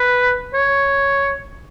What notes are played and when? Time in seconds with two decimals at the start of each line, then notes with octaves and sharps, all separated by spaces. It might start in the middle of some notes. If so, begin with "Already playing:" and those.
Already playing: B4
0.54 C#5